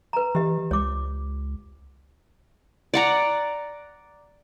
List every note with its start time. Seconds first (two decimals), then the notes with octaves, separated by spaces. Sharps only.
0.13 B4 A#5
0.35 E3 G4 D#5
0.71 C#2 C#5 D6
2.94 D5 F#5 A#5